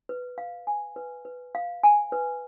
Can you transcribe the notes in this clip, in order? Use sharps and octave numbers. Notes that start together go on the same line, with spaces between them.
B4
F5
G#5
B4
B4
F5
G#5
B4